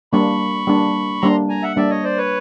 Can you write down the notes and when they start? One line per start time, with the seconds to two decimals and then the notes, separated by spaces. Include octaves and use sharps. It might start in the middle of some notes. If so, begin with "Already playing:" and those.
0.13 G3 A#3 D4 B5 C#6
0.67 G3 A#3 D4
1.22 G3 A#3 D4 A#5 C6
1.49 G#5 A#5
1.63 E5 F#5
1.76 G3 A#3 D4 D5 E5
1.90 C#5 D#5
2.04 C5 D5
2.18 B4 C#5